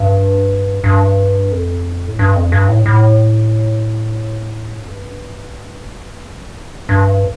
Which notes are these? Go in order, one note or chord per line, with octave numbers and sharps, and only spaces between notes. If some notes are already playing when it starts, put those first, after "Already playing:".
Already playing: G2
G2
F2
A2
G2
F2
G2
A2
A2
F2
G2
G2